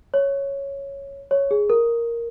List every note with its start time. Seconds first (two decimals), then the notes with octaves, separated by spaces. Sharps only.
0.14 C#5
1.31 C#5
1.51 G#4
1.70 A#4